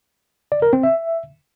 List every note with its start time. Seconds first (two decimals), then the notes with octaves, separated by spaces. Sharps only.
0.52 D5
0.62 A#4
0.73 C4
0.83 E5